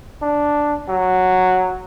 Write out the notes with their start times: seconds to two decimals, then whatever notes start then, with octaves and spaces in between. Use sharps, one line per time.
0.22 D4
0.89 F#3